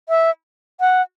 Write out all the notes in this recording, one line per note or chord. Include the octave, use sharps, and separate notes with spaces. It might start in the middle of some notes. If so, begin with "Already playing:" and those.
E5
F#5